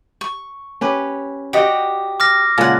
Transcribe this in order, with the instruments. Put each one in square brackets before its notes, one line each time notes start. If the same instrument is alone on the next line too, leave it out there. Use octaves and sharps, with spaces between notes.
[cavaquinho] C#6
[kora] C#4 G4 B4
[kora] F#4 D5 G5 [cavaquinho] G4 D#5
[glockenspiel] D6 F6 A#6
[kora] A#2 C#3 G#3 [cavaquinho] F#5 A5